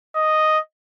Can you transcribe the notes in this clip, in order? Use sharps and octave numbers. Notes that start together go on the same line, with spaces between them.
D#5